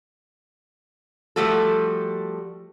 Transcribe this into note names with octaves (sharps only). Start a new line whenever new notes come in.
F3 G3 A3 F#4 A4